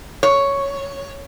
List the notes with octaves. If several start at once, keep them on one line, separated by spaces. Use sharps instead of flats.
C#5